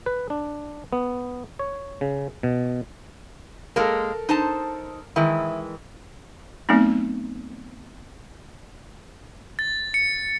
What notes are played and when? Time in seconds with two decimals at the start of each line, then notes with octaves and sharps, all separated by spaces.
0.06 B4
0.30 D4
0.93 B3
1.59 C#5
2.01 C#3
2.43 B2
3.76 G#3 A#3 A4 A#4
4.29 D#4 C5 A5
5.16 D#3 E3 G#3 E4
6.69 F#3 A3 B3 C4 D#4
9.59 A6
9.94 C#7